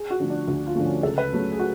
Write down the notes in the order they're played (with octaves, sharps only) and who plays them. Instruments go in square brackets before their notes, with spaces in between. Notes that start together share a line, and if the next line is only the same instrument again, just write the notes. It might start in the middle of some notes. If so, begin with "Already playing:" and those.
Already playing: [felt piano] G#4
F#4
D3 F3 A3
D4
D2 F#4
F4
D3 F3 A3
C#4
C#2 A4
B4
C#3 F#3 A3
G#4
F#4